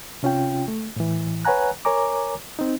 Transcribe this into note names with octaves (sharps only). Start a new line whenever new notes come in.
C3 C#4 F4 G5
A3
A2 E3
B4 C#5 F#5 G#5 A#5 F#6
A#4 C#5 G#5 A#5 D6
C4 D#4